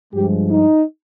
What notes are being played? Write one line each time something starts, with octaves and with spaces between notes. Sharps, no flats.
G2 F3 G#3 G4
D#4